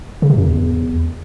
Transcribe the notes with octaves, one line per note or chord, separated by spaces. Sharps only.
C#3
C3
F#2
E2